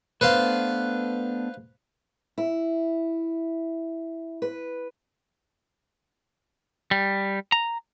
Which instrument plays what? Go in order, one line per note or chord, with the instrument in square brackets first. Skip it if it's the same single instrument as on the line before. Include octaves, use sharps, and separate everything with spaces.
[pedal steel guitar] A3 B3 D4 [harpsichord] B4 C5 F5
[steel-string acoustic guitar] E4
B4
[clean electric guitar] G3
A#5